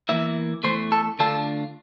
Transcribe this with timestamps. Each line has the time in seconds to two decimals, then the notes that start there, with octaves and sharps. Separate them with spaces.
0.09 E2 E3 A#3 E4 E5
0.64 E2 E3 A3 C5
0.92 A4
1.19 D3 A3 D4 F4 A4